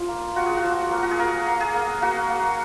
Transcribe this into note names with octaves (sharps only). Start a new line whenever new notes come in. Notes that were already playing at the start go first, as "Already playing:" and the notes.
Already playing: F3 F4
A#3
F4 F#4
G#4
F#4
F3
A#3
F#4
G#4
A#3 A#4
A#3
G#4
A#3
A#3 F#4
A#3